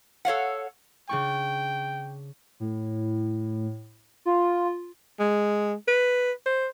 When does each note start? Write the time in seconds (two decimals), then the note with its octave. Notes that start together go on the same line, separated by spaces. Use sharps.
0.25 A4 C#5 F5 F#5
1.09 C#3 D4 G5 C#6
2.60 A2
4.25 F4
5.20 G#3
5.88 B4
6.46 C5